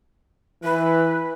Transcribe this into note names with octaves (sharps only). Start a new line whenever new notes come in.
E3 B4